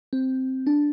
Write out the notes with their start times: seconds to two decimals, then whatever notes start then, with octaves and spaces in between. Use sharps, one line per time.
0.13 C4
0.67 D4